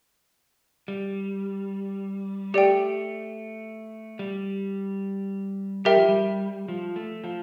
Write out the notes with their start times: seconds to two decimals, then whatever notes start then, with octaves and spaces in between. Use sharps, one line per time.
0.88 G3
2.54 A3 G4 D5 G5
4.19 G3
5.85 G3 G4 A#4 E5 G5
5.97 F3
6.09 G3
6.68 F3
6.96 A3
7.24 F3